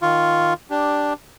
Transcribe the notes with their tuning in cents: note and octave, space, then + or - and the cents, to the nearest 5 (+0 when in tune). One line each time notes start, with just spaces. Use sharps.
D#3 +0 F4 +0 C#6 +5
D4 +0 G4 +0